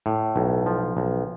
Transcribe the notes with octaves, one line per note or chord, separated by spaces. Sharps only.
A2
B1
F3
B1